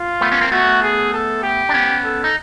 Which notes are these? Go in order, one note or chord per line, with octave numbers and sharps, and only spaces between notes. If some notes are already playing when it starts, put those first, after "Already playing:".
Already playing: F4
A3 B3
B3 C#4
A#3 C4
A3 B3 F#4
G#4
A4
G4
D4
B3 C#4
A4
D#4